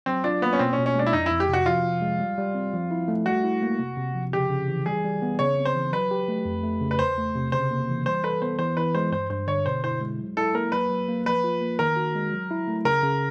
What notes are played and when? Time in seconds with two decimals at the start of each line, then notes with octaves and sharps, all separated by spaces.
0.06 F#3 C4
0.24 D4 F4
0.41 A#3 B3
0.53 C#4
0.59 B2 C4
0.73 C#4
0.78 B2
0.86 C#4
0.95 G#3 D4
1.06 E4
1.13 F2 D#4
1.26 F2 E4
1.40 G4
1.48 C3 F#4
1.66 F3 F4
1.84 F3
2.02 G#3
2.20 G3
2.38 G3
2.55 C4
2.74 F3
2.91 E4
3.08 A3
3.26 G3 F#4
3.44 E4
3.62 A#3
3.80 C3
3.97 C3
4.15 F3
4.33 C#3 G4
4.50 C#3
4.68 E3
4.86 G3 G#4
5.04 G3
5.22 B3
5.39 C#3 C#5
5.57 C4
5.65 C5
5.75 E3
5.92 F#3 B4
6.11 G4
6.28 A3
6.45 F2
6.63 A3
6.81 C#3
6.91 B4
6.99 E2 C5
7.18 A3
7.35 C3
7.52 C#3 C5
7.71 A#3
7.89 E3
8.06 G3 C5
8.24 A4 B4
8.42 B3 C5
8.59 E3 C5
8.77 E3 B4
8.95 G#3 C5
9.12 G2 C5
9.30 G2 C5
9.47 D3 C#5
9.66 B2 C5
9.84 E4 C5
10.01 G#3
10.20 F#3
10.37 E4 A4
10.54 A#3 A#4
10.72 F#3 B4
10.90 F#3
11.08 A#3
11.25 F3 B4
11.44 F4
11.61 A#3
11.79 D#3 A#4
11.96 F#4
12.15 G#3
12.33 F#3
12.51 E4
12.68 A3
12.85 C#3 A#4
13.03 C#3